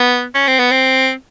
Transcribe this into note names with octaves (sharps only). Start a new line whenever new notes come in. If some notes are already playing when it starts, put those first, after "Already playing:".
Already playing: B3
C#4
C4
B3
C4